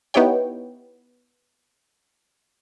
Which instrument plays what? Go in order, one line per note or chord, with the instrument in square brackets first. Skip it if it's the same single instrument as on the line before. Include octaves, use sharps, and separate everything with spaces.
[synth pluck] B3 D#4 E4 G4 C#5 G5